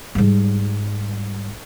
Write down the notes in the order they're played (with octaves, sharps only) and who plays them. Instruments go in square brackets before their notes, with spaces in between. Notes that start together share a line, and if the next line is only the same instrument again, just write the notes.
[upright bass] G#2 G3